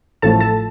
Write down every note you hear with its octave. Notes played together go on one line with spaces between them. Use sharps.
A1 A2 F3 A3 A4 A5
A4 A5